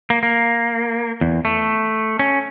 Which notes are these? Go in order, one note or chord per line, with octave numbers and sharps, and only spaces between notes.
A#3
A#3
E2
A3
C#4